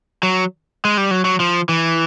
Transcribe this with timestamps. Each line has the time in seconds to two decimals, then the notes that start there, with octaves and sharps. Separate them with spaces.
0.23 F#3
0.85 G#3
0.97 G3
1.11 F#3
1.25 F#3
1.40 F3
1.69 E3